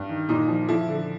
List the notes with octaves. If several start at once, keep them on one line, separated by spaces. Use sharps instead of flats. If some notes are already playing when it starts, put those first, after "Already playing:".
Already playing: G2
D#3
A#2 D#4
F3
F3 E4
D3